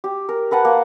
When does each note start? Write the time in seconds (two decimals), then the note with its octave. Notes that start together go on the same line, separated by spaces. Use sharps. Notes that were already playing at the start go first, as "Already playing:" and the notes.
0.04 G4
0.29 A#4
0.51 A#4 B4 F#5 A5
0.65 A#3